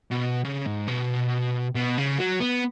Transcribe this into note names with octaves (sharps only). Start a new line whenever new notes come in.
B2
C#3
G#2
B2
B2
C#3
F#3
B3